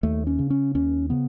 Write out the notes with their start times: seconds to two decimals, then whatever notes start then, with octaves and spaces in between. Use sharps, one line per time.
0.03 D#2 A3
0.27 C#4
0.39 C#3
0.50 C#4
0.75 D#2 C#4
1.10 C#3 B3